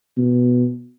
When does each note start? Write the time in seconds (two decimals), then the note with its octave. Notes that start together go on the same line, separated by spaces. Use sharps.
0.17 B2